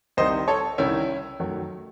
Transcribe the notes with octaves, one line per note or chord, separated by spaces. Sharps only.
C2 C3 D#3 C5 D#5
A4 C#5
C2 C3 D#3 C#4 E4
F#2 D#3 F#3 A3